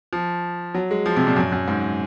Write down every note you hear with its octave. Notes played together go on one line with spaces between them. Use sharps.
F3
F#3
G#3
F3
C3
A#2
F#2
F#2
G#2